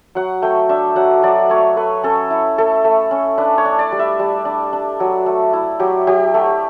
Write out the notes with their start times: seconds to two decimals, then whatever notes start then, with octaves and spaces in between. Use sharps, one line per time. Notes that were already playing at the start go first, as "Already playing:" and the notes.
0.15 F#3 F#5
0.42 A3 G5
0.69 D4 E5
0.96 F#3 F#5
1.23 F#3 D5
1.50 A3 C#5
1.76 A3 B4
2.03 C#4 A4
2.30 E4
2.58 A3 A4
2.84 A3
3.11 C#4
3.38 D4 B4
3.58 C#5
3.65 D4
3.79 D5
3.92 G3
3.99 E5
4.19 G3
4.45 D4
4.73 D4
5.00 F#3
5.26 A3
5.53 E4
5.80 F#3 G4
6.07 F#3 G4
6.34 A3 G4